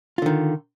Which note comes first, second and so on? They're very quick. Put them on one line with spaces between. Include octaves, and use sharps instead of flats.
F4 D3 D#3